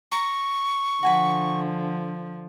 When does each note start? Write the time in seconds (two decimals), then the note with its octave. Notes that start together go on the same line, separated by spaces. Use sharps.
0.12 A#5 C#6
1.03 D3 F3 F#4 G#5 B5